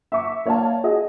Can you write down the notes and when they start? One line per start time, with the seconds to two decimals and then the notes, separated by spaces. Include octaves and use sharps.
0.12 E5 C#6 D6
0.45 A#3 C#5 D5 F5 A5
0.84 F#4 G#4 D#5